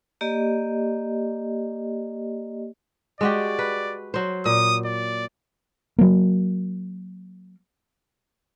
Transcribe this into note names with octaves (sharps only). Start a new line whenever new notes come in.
A#3 G4 D5 D#5
G#3 F#4 G4 D5
B4
F#3 C5
A#2 D#6
D5
F#3 A#3